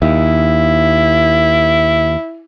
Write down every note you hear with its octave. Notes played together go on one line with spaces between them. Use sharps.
D#2 E4